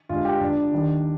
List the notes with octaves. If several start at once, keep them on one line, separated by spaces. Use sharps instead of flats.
G1 G2 D3 G#3 F4
G4
G1 G2 F3 D4
D#2 D#3 G3